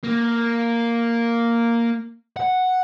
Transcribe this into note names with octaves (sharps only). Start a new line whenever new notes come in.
A#3
F#5